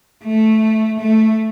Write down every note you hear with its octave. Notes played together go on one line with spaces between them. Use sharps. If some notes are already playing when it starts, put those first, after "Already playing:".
A3
A3